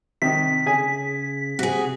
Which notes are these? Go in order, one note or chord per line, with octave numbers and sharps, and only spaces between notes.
C3 D#3 B6
C#3 G#4 G#5
C3 F#4 G#4